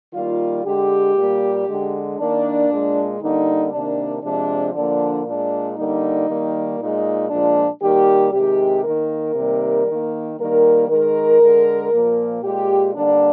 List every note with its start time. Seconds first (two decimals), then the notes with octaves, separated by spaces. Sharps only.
0.12 D#3 G3 A#3 F4
0.64 D3 G#3 G4
1.15 A#2 G3 A#3
1.66 D3 G#3
2.18 D#3 A#3 D4
2.69 A#2 G#3
3.20 D3 G3 A#3 D#4
3.71 C3 D#3 A#3 D4
4.22 C3 F3 G#3 D4
4.73 D3 F3 A#3 D4
5.25 A#2 G#3 D4
5.76 D3 G3 A#3 D#4
6.27 D#3 G3 A#3
6.79 A#2 G#3 D#4
7.30 A#2 F3 G#3 D4
7.81 D#3 G3 A#3 G4
8.32 C3 D#3 G#3 G4
8.83 D#3 A#3 A#4
9.34 C3 D#3 G3 A#3
9.86 D#3 A#3
10.37 D#3 G3 A#3 A#4
10.88 D#3 G#3 A#4
11.40 D3 G#3
11.91 A#2 F3 A#3
12.42 A#2 G#3 G4
12.93 D3 G3 A#3 D4